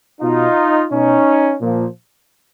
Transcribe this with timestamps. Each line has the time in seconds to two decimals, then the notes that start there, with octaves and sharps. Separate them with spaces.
0.21 B2 D#4 F4
0.91 B2 C#4 D#4
1.61 A#2 F3